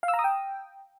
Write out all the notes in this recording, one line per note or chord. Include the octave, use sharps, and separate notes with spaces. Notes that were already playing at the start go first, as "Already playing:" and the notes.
F5
E6
A#5
D#6
G5